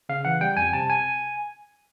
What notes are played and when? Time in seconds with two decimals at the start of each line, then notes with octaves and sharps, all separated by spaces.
0.09 C#3 F5
0.25 E3 F#5
0.41 G3 G5
0.57 F2 G#5
0.73 C3 A5
0.90 G#5